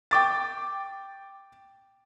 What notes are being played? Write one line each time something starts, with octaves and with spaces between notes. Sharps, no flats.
G5 D6 A6